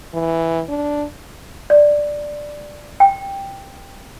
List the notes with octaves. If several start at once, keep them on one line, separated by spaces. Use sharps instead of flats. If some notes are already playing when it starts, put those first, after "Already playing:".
E3
D4
D5
G5